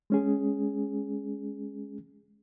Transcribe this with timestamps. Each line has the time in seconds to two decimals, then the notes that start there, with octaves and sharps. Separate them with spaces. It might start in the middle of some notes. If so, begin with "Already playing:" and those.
0.10 G#3 C#4 G#4